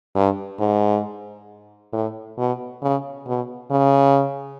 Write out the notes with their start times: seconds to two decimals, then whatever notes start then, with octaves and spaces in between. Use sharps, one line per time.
0.15 G2
0.60 G#2
1.93 A2
2.38 B2
2.82 C#3
3.27 B2
3.71 C#3